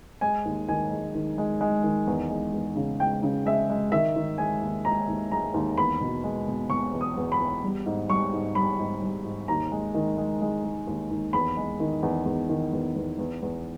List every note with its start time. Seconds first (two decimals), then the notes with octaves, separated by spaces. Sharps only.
0.21 G#3 G#5
0.45 D#2
0.68 D#3 G#5
0.91 G#3
1.15 D#3
1.38 G#3
1.61 G#3
1.83 D#3
2.07 E2
2.30 G#3
2.53 E2
2.76 C#3
2.99 G#3 G5
3.23 C#3
3.46 G#3 E5
3.70 G#3
3.92 D#3 E5
4.16 D#3
4.38 G#3 G#5
4.61 D#2
4.85 G#3 A#5
5.08 D#2
5.31 G#3 A#5
5.54 D#2
5.77 E2 B5
6.01 B2
6.24 G#3
6.48 B2
6.70 B2 C#6
6.93 E2
7.01 D#6
7.17 E2
7.32 B5
7.39 E2
7.63 G3
7.86 G#2
8.09 G3 C#6
8.33 G#2
8.55 G3 B5
8.79 G#2
9.02 G3
9.24 G#2
9.48 D#2 A#5
9.72 G#3
9.94 D#3
10.17 G#3
10.41 G#3
10.64 G#3
10.87 D#2
11.11 D#2
11.33 E2 B5
11.57 G#3
11.80 D#3
12.03 E2
12.25 E2
12.49 D#3
12.73 E2
12.96 E2
13.18 E2
13.42 E2